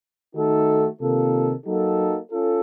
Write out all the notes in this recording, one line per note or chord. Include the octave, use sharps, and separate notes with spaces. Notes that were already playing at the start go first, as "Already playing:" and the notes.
D#3 A3 D#4 F#4 A4
C3 D#3 A#3 F4 A4
F#3 A#3 D#4 F#4 A4
C#4 F4 A4